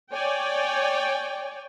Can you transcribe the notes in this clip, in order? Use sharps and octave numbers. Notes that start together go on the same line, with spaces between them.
C#5 D5 G5 G#5